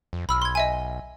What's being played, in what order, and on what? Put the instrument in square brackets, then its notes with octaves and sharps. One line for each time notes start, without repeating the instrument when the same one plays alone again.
[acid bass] F2
[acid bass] B1 [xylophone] B5 E6 F6
[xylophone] C6 G#6
D#5 E5 G#5